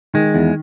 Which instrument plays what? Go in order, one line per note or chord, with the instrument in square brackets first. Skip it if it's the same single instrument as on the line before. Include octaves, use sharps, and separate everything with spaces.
[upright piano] D#3 [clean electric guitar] G#3
[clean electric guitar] E2